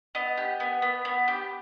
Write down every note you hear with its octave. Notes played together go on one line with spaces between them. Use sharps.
B3 D#5
G4
B3
B3
B3
G4